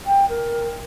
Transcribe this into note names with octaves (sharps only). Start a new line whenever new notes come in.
G5
A#4